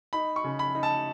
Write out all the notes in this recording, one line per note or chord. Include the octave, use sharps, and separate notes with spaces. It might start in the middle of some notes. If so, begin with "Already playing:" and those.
D#4 B5
C#6
C#3
B5
D#4
A5